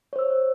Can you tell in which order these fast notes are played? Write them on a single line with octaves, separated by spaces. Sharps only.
C#5 C5 E6